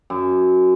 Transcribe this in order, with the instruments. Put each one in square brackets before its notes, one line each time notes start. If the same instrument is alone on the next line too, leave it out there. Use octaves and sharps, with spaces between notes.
[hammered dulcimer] F#2